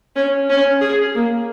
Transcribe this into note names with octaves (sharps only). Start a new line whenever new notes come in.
C#4
C#4
G#4
A#3